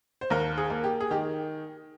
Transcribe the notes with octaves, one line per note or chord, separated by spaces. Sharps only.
C5
D#2 A#4
G#4
A#3
G4
G#4
D#3 G4